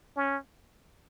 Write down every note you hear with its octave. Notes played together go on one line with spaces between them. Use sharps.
C#4